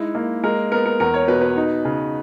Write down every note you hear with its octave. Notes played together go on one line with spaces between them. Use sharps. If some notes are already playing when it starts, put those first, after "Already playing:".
Already playing: G#3 D#4 E4
A#3
G#3 A#4
B3 A#4
A#4
E2 A#4
C#5
B2 B4
B4
D#4
C#3